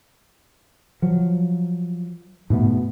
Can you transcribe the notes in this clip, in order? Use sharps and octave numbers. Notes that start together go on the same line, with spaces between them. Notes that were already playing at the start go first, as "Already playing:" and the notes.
F3 F#3
G#2 B2 A3 B3